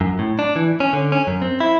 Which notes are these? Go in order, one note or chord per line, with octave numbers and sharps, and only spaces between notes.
F#2
A2
D4
E3
C#4
D3
C#4
F#2
C4
E4